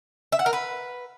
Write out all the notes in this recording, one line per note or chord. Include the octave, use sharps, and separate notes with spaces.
E5
F#5
A#4
B4